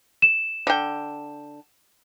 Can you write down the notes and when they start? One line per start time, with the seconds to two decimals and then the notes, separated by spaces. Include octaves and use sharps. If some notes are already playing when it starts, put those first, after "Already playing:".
0.22 E7
0.67 D3 G5